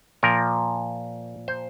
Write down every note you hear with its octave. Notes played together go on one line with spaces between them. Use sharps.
A#2 F3 A#4
C5